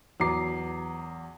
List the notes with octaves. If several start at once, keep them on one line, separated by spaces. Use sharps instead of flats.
E2 F#3 A#5 D6 C7